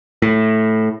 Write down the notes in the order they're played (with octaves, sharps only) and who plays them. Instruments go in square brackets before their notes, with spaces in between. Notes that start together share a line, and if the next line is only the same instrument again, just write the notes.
[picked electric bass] A2